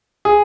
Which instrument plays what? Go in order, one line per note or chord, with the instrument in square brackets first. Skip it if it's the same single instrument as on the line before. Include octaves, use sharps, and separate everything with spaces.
[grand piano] G#4